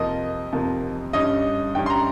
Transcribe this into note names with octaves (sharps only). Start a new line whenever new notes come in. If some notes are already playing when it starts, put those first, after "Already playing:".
Already playing: F2 C3 F3 A#3 D#5
F2 C3 F3 A#3
G2 G3 C#4 D#5
G2 G3 C#4 G5
C6
A#5